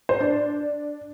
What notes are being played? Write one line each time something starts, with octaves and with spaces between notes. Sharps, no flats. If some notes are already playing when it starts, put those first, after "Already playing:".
C5
D4 D5